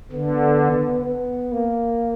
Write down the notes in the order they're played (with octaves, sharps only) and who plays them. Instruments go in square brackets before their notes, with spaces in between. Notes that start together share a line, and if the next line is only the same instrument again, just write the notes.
[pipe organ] D3 [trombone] B3
[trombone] B3
A#3